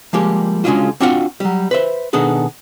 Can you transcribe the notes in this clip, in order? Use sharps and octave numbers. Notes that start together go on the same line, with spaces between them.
F3 G3 G#3 A#3 G4
C#3 G#3 C#4 D4 F4 F#4
C4 D4 F4 F#4 F5 F#5
F#3 G3
B4 C5 E5
B2 D#3 B3 D4 G#4 A4